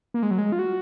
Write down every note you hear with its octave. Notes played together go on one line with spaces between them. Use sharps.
A#3
G#3
F#3
G#3
F4
F#4